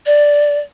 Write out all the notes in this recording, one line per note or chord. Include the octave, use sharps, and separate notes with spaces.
D5